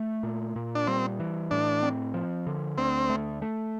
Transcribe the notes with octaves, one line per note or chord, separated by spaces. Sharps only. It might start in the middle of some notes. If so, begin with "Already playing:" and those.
Already playing: A3
A#2
A#2
D4
G3 C4
E3
A2 D4
C4
F3
D3
D2 C4
A3
A3